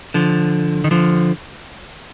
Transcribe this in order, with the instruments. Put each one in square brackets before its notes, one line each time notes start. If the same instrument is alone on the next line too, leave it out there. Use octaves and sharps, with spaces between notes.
[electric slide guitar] D3 F3
D#3
D3 F3